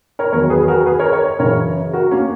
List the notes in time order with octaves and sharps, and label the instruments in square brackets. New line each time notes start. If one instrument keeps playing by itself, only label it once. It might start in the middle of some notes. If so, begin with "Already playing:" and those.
[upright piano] A#4 C#5
E2 D#3 F#3 A#4 C#5
G#4 B4
G#4
F#4 A#4
G#4 B4
A#4 C#5
A#4 C#5
F#2 C#3 E3 A#4 C#5
F#4 A#4
A#3 C#4